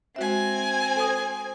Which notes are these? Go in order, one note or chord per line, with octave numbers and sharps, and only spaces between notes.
G#3 C4 F#4 E5 G#5
A4 C5 D#6